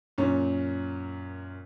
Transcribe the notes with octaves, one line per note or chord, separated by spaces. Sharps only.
F#2 A#2 C#4